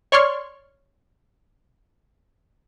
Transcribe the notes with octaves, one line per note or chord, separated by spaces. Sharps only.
C#5 D5 C6 C#6 F6